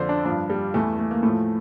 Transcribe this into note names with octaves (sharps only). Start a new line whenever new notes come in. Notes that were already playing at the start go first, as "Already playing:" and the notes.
Already playing: F2 D3 F3 C5 D5
D4
G2 F3 D4
G3
E2 E3 A3
A3
A#3
A2 F3 A3